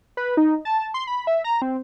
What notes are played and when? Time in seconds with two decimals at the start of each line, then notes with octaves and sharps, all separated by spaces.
0.17 B4
0.37 D#4
0.65 A5
0.94 C6
1.07 B5
1.27 E5
1.44 A#5
1.62 C4